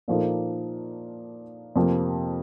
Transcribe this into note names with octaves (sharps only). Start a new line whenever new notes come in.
A#2 F3 A#3 D#4 A4
F2 C3 F3 A#3